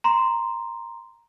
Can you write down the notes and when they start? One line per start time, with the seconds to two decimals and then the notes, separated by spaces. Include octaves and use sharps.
0.04 A#5 C6